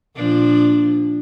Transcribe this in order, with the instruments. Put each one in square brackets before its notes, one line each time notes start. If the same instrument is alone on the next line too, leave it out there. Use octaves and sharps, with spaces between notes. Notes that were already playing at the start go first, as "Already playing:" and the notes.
[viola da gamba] A#2 F3 D4